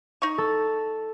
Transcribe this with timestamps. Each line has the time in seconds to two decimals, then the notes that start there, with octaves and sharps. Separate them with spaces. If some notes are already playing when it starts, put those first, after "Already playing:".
0.22 D#4 C#6
0.38 A4